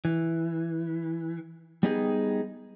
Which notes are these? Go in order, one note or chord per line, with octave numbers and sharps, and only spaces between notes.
E3
G3 B3 D#4 G4 G#4